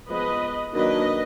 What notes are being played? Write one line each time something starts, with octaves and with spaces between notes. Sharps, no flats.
F3 G#3 B3 B4 D#5
D#3 F#3 A#3 D4 B4 D#5